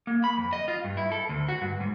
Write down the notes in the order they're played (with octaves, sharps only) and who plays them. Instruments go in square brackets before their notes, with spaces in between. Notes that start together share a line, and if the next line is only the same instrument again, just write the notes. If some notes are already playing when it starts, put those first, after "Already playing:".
[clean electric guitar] A#3
B5
F2
D#5
F4
G2
E4
A4
D2
F#4
G2
G#2